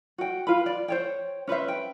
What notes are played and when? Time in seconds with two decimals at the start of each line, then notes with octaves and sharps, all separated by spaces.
0.18 F#4 G5
0.47 F4 B4 B5
0.66 D5
0.88 C5 C#5 G5
1.47 C#4 B4 C5 E5
1.68 G5